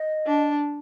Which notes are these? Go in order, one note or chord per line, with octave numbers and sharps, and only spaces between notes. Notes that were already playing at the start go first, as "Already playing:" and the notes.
Already playing: D#5
D4